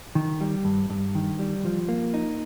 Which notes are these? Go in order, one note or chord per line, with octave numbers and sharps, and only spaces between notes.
D#3
G3
G2
G2
D#3
G3
F3
A#3
D#4